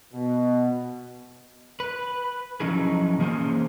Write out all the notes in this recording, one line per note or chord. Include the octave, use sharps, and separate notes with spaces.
B2
B4
F3 F#3 C#4 D#4 E4 G#4
E3 A#3 C#4 G#4 C5